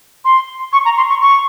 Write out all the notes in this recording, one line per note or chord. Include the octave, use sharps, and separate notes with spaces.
C6
C#6
A#5
C6
C#6
C#6